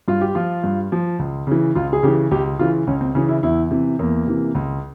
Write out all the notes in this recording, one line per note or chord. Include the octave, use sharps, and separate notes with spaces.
G2 F4
G4
F3 F4
G2
F3
C#2
C#3 E3
C#2 F4
G#4
C#3 E3 G4
C#2 G4
C#3 E3 F4
C#2 C#4
C4
C#3 E3 C#4
E4
E2 E4
C3 E3
E2 A#3
C3 E3
C#2